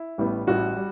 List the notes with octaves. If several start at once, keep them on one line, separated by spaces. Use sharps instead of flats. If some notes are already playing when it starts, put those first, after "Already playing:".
Already playing: E4
A1 A2 G3 B3
A1 A2 G3 F#4
G3